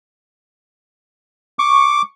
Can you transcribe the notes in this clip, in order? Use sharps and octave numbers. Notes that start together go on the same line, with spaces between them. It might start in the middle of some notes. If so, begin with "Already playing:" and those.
C#6 D6